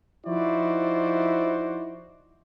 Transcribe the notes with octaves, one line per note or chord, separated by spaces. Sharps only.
F3 D#4 E4 F#4 C5 D5